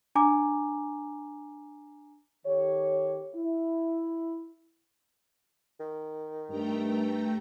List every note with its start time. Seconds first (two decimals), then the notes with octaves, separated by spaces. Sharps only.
0.15 D4 G#5 A#5 D6
2.46 D#3 G4 A4 C#5
3.35 E4
5.80 D#3
6.49 G2 A3 G5 A#5